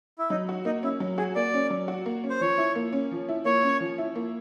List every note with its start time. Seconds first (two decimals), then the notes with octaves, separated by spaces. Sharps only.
0.18 E4
0.30 F#3 D#4
0.49 F#4
0.65 A#3 D#4
0.83 C#4 E4
1.00 F#3
1.18 F#4 G#4
1.35 A#3 D5
1.54 C#4
1.70 F#3
1.88 F#4
2.06 A#3
2.24 C#4
2.30 C5
2.41 F3 C#5
2.58 E4
2.75 A#3
2.93 C#4
3.11 F3
3.29 E4
3.45 A#3 C#5
3.63 C#4
3.80 F3
3.98 E4
4.16 A#3